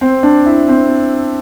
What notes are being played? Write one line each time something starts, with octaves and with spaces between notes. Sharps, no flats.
C4
D4
E4
C4